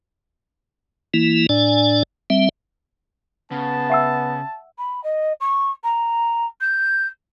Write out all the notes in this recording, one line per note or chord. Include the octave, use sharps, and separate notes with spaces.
E3 A#3 E4
A2 D4 D5 G#5
G3 C4 E5
C#3 B3 A5
E5 F#5 E6
B5
D#5
C#6
A#5
G6